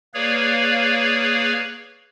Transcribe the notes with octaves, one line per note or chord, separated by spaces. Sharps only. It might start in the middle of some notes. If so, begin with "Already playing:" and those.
A#3 G#4 B4 C#5 D5 F5